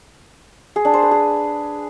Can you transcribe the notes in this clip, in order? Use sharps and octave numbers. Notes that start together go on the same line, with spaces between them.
G#4
D4
C5
B4
G#4